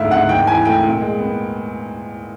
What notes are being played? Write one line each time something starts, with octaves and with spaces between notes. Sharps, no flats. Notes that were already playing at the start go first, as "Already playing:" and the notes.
Already playing: D2 G#2 A3 E5 F5
G#2 F#5
D#2 G5
E3 G#5
A3 G5
A#2
G#3
B3